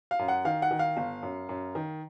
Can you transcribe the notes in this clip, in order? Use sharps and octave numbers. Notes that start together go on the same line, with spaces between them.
F5
F#2
F#5
D#3 F5
F#5
D#3
F5
G1
F#2
F#2
D#3